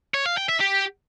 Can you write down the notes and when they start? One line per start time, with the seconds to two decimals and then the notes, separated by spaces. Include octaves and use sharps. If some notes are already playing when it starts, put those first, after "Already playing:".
0.14 C#5
0.26 F5
0.37 G5
0.49 E5
0.60 G4